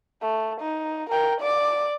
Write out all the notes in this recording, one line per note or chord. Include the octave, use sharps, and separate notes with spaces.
A3
D#4
A#4 G5
D5 D6